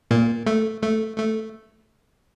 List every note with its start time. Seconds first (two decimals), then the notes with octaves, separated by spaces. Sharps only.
0.11 A#2 A#3
0.47 A3
0.82 A3
1.18 A3